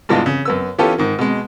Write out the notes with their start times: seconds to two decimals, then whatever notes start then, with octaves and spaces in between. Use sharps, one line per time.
0.09 G2 B2 E3 G#3 D4 F4
0.26 C#3
0.45 F#2 B3 E6
0.79 E3 B3 C#4 F4 G4 A4
0.98 G#2 D#3
1.19 B2 G#3